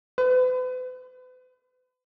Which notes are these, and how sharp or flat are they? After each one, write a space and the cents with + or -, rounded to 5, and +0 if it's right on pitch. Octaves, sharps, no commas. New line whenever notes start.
B4 +40